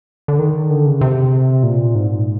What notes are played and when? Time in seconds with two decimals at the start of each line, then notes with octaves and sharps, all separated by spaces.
0.28 D3
0.39 D#3
0.70 D3
0.86 C#3
1.01 C3
1.63 A#2
1.95 G#2